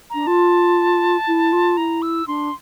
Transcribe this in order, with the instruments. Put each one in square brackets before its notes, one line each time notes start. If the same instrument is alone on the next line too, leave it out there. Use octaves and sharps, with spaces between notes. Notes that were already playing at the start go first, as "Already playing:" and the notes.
[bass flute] D4 [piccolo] A#5
[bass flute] F4 [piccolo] A5
[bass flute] E4
F4
[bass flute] E4 [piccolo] A#5
[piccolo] E6
[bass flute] D4 [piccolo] C6